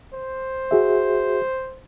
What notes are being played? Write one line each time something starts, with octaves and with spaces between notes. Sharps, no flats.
C5
F#4 G#4 E5